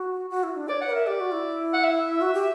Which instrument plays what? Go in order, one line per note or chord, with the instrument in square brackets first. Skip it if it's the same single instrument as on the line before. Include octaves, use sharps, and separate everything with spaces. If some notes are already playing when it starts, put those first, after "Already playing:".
Already playing: [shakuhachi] F#4
F#4
E4
D4
[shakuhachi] C#5 [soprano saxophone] D5
[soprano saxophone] F#5
[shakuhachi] B4
[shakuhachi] A#4 [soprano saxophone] E5
[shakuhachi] G4 [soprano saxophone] D5
[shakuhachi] F#4
E4
[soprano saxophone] F#5
E5
[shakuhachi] F#4
G4